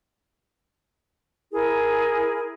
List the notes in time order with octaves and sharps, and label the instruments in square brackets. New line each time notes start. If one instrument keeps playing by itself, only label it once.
[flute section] E4 G#4 A#4